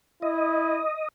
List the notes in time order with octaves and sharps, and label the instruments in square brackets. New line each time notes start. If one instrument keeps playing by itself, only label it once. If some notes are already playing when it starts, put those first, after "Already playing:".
[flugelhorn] E4 [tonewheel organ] D#5